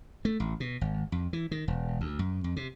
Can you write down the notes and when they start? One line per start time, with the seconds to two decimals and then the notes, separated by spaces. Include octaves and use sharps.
0.25 A3
0.40 A1
0.60 B2
0.81 G#1
1.12 F2
1.33 E3
1.51 D#3
1.68 E1
2.01 D2
2.19 F#2
2.44 F2
2.56 C3